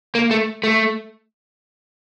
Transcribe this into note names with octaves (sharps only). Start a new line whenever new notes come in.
A#3
A3
A3